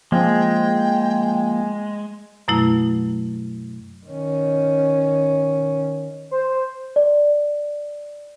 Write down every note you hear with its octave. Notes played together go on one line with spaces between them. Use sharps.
F3 G#3 A#3 C4 G5
F#2 B2 F#3 A3 E4
D#3 C#4
C5
D5